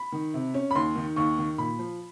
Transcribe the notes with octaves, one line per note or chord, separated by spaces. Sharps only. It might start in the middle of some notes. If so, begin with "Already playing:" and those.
Already playing: B5
D#3
C3
C#4
B5
D#2 C6
D#3
D#2 C#6
D#3
A#2 B5
F3